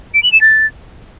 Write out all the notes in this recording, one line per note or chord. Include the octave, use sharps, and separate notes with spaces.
D7
F#7
E7
A6